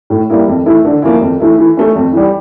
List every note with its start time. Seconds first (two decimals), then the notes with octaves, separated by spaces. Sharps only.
0.10 A2
0.30 G3 A#3 E4
0.48 F2
0.66 E3 A3 E4
0.85 D3
1.02 F3 A#3 C#4 E4
1.21 F2
1.40 E3 A3 E4
1.58 E3
1.77 A3 C#4
1.96 F2
2.13 E3 G3